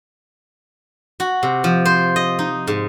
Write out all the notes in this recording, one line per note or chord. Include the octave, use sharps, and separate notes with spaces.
F#4
C3
F3
C5
D#5
D#4
G#2